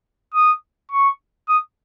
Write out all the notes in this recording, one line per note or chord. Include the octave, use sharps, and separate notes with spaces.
D#6
C#6
D#6